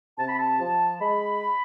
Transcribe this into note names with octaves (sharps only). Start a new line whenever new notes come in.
C3 A5
B5
A5
F3
G#3 B5